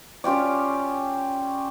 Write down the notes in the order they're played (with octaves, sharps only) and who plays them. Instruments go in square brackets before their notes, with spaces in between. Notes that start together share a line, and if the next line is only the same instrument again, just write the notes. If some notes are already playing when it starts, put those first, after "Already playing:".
[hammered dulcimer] C#4 F4 G4 D5